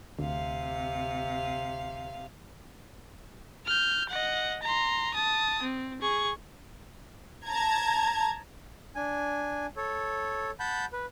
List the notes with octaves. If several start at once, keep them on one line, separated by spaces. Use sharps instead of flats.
D2 C3 F5
F6 G6
D#5 F#5
A#5 C6
A5 D#6
C4
G#4 C#6
A5 A#5 G#6
D4 G#5
A4 C#5
F#5 A5 B5 G6
B4